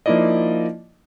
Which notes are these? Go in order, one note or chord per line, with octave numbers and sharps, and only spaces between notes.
F3 A#3 D#4 E4 D5 D#5